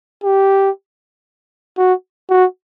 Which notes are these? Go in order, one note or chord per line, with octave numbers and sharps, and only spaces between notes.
G4
F#4
F#4